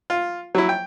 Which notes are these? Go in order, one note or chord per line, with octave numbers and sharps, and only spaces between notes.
F4
F#3 E4
G5